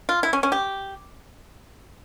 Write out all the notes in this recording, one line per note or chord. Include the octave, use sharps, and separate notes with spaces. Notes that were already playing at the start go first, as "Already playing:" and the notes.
F4
E4
C#4
C#4
G4